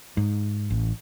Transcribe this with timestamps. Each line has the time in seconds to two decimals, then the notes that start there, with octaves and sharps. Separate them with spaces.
0.17 G#2
0.70 A1